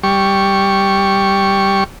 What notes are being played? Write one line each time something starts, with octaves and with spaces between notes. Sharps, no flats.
G3 C#6